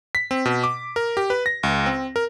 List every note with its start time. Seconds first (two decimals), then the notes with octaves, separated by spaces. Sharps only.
0.15 B6
0.31 C4
0.45 B2
0.64 D6
0.96 A#4
1.17 G4
1.30 B4
1.46 A#6
1.63 C#2
1.86 C4
2.16 A#4